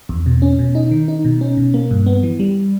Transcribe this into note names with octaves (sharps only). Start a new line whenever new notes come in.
E2
B2
C#4
B2
D#4
D#3
D#4
B2
C#4
B2
A#3
G2
B3
E3
G3